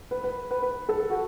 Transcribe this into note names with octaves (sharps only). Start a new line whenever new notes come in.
B4
B4
B4
B4
A4
F#4